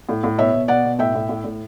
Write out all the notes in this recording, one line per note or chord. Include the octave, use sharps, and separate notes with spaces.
A2
A2
B2 C#5 E5
B2
B2 D5 F#5
B2
A2 E5 G5
A2
A2
A2